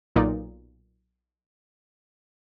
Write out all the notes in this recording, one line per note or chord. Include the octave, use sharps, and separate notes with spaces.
B1 A#2 A#3 D#4 D5